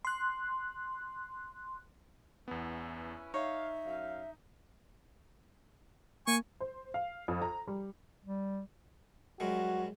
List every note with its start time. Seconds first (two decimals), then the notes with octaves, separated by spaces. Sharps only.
0.05 C6 F#6
2.48 E2 B3 C#4 E4 B4
3.34 D#4 C#5 E5 F5
3.85 F#2 F5
6.27 A#3 G#5 C#6
6.60 C5
6.94 F5
7.28 F2
7.42 A#5
7.68 G3
8.25 G3
9.40 F#2 G3 G#3 F#4